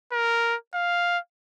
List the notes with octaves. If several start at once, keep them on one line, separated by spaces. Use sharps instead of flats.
A#4
F5